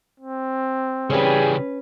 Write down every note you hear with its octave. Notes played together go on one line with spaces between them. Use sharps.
C4
C#3 E3 G3 C#4 G#4 B4